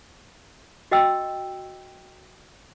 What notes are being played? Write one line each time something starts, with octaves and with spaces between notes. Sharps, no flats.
F#4 D#5 G5 E6